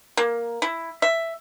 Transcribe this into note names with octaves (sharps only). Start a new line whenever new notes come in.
A#3
E4
E5